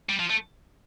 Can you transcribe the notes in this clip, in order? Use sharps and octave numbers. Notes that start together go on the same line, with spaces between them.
G3
F3
A3